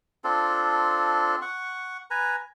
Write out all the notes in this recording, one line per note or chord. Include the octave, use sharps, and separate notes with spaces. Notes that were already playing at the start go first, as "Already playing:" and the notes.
C4 D4 F4 A4
F#5 C#6
B4 G#5 A#5